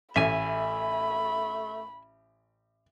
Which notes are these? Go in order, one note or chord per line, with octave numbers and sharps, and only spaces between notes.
A1 A3 E5 G#5 B5